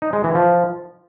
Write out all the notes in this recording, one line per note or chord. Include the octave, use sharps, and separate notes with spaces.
D#4
G#3
E3
F3